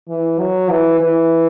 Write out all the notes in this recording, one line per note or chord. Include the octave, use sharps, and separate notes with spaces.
E3
F#3
E3
E3